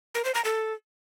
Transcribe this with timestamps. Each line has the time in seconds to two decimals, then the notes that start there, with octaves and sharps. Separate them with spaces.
0.15 A#4
0.25 C5
0.35 A#5
0.45 A4